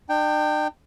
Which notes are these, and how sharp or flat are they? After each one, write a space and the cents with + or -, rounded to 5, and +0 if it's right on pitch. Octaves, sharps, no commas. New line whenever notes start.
D4 +45 G5 +0